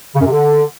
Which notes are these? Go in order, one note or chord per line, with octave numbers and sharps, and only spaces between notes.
C#3
F#2
C3
D3